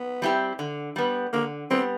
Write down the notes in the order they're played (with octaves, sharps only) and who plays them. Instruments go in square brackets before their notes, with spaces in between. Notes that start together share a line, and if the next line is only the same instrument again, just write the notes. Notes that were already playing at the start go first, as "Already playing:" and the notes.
Already playing: [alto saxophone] B3
[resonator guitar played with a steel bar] G3 C4 E4 G4
D3
G3 B3
[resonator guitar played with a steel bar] D3 [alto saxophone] A#3
[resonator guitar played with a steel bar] G3 B3 [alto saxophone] C4